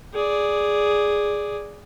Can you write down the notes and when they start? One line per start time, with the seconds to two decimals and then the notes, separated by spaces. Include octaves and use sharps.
0.14 G#4 D5